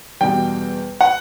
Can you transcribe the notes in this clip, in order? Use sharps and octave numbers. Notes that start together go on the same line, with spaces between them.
E2 B2 G3 G5
F#5